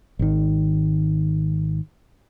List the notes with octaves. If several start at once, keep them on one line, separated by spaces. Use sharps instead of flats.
G#1 D#3